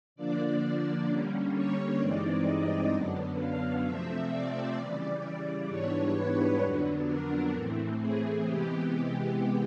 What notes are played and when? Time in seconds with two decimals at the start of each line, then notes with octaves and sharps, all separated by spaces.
0.16 D3 F3 A#3 D4 D5
1.07 D3 G3 A#3 C#4
1.54 C#5
1.99 G2 E3 G#3 C4 D#4 D5
2.46 D#5
2.91 F#2 D3 F#3 B3 D4
3.39 F5
3.84 C3 F3 A3 C4 E5
4.30 D5
4.76 C#3 E3 G3 D5
5.68 G#2 E3 G3 B3 D4 C#5
6.14 B4
6.61 F2 D3 F#3 B3 D4
7.07 A#4
7.53 A2 E3 A3 C4
7.99 G#4
8.45 C3 E3 G#3 B3 G4